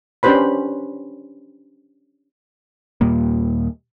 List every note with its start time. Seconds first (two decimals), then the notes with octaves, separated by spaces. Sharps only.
0.23 C#4 D4 G4 B4 C5 B5
3.01 D#2 A#2 G3 A#3